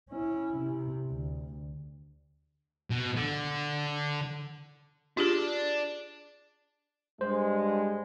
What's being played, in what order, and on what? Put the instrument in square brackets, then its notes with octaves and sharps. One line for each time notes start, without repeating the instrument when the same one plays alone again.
[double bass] C#4 E4
C3
D2
[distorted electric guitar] B2
D3
[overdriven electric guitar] D4 [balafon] F4 G4 G#4
[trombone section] G2 G#3 [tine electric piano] C5